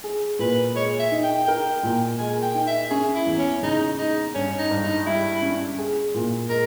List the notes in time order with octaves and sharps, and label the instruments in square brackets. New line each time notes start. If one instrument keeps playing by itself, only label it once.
[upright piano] G#4
[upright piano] A#2 [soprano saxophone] B4
[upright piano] G#3 [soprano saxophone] C#5
[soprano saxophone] E5
[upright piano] D#4
[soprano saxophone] G5
[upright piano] A#4 [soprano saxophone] G5
[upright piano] A#2
[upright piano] G#3 [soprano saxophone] G#5
[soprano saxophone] G5
[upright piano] D#4
[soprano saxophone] E5
[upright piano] C#4 [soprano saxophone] G#4
[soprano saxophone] E4
[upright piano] E2
[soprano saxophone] C#4
[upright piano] C#3 [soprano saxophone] D#4
[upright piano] G#3 [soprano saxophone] D#4
[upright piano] G2 [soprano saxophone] C#4
[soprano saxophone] D#4
[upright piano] G2
[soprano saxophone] D#4
[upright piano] G3 [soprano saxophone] E4
[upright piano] C#4
G#4
A#2
[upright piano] G#3 [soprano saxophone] A#4